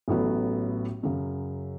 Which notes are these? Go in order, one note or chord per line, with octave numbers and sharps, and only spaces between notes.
A1 A2 F#3 B3
F#2 C#3 F#3